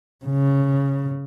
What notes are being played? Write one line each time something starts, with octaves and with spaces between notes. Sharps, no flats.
C#3